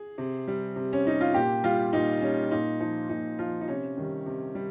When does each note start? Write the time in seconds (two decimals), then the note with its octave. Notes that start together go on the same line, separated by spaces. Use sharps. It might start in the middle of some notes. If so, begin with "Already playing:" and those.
Already playing: G#4
0.18 C3
0.48 G3
0.76 C3
0.93 C#4
1.06 G3 D#4
1.21 F4
1.34 A#2 G4
1.64 G3 F4
1.93 A#2 D#4
2.22 G3 C#4
2.51 A#2 D#4
2.80 F3 D#4
3.09 A#2 D#4
3.39 F3 F4
3.61 D#4
3.68 C3 C#4
3.97 D#3 G3
4.26 C3
4.55 G3